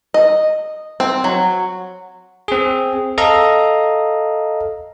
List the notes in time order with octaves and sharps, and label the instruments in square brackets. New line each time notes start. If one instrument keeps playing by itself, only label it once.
[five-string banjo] D#5
C4
F#3
[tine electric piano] C4 G#4
A4 D#5 F5 A#5